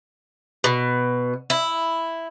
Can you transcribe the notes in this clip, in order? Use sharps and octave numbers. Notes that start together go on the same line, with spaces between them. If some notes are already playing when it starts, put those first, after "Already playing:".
B2
E4